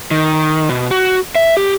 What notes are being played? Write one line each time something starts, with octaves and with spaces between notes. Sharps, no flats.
D#3
B2
F#4
E5
G4